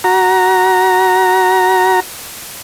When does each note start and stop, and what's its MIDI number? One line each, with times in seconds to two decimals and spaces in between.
0.04 2.00 66
0.04 2.00 82